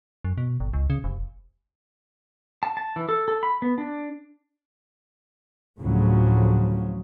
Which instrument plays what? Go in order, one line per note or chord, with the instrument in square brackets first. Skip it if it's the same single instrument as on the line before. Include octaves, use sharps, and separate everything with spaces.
[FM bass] F#2
B2
G1
C#2
C#3
F1
[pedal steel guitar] A5
A5
E3
A4
A4
B5
B3
D4
[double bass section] D2 A2 C#3 F3 F#3